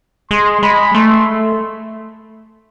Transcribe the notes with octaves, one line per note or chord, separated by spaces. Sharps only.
G#3 C6
G#3 B5
A3 C6